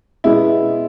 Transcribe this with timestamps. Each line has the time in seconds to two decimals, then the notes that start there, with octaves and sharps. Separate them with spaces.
0.24 B2 G#3 B3 E4